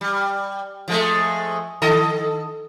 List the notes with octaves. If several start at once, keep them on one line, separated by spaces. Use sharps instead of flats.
G3
F3 G#3 A3
D#3 A4 D#5